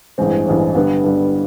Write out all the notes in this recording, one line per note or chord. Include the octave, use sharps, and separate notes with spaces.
A1 G2 E3 G#3 C4
A1 G2 E3 G#3 C4
G2 D3 G3 B3
G2 D3 G3 B3